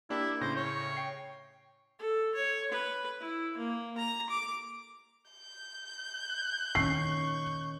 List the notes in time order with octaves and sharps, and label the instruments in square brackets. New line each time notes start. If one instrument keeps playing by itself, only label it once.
[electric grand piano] A#3 D4 G4 [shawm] E4
[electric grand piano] A2 C#3 A#6 [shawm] C5
[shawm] C#5
[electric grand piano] G5 C7
[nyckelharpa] A4
C#5
B4
E4
A#3
A#5
D6
[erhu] G6
[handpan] A#2 D#3 C#4 [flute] C#6 [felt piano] C7